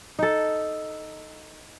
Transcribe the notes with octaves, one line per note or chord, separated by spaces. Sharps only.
D#4 A4